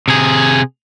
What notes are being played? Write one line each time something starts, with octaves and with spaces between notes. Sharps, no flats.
C3 G#4